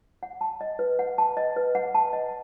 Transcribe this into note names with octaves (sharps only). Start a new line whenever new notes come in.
F#5
A5
D#5
B4
F#5
A5
D#5
B4
F#5
A5
D#5